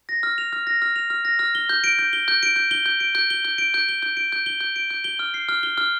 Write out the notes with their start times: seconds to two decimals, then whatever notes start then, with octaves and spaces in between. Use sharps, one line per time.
0.09 A#6
0.23 F6
0.38 F7
0.53 F6
0.67 A#6
0.82 F6
0.96 F7
1.10 F6
1.25 A#6
1.39 F6
1.55 G7
1.69 G6
1.84 D7
1.99 G6
2.13 G7
2.28 G6
2.43 D7
2.56 G6
2.71 G7
2.86 G6
3.00 D7
3.15 G6
3.30 G7
3.45 G6
3.58 D7
3.74 G6
3.89 G7
4.03 G6
4.17 D7
4.32 G6
4.46 G7
4.61 G6
4.76 D7
4.91 G6
5.04 G7
5.19 F6
5.34 C7
5.49 F6
5.63 G7
5.78 F6